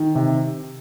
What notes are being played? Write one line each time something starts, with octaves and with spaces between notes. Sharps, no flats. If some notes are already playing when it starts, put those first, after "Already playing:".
Already playing: D#3
C3